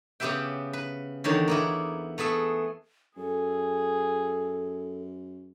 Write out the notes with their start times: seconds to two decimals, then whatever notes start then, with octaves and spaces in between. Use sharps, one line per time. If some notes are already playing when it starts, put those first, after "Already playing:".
0.20 C#3 B3 G4 B4 E5 G5
0.73 B4
1.24 E2 D3 D#3 C#5
1.48 A#3 B3 E4
2.18 A3 B3 G#4 E5
3.17 F#2 G#4 A4